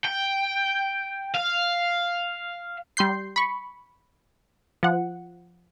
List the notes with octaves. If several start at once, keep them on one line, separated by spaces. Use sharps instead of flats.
G5
F5
G3 C6 G6 C7
B5 C#6
F3 F#5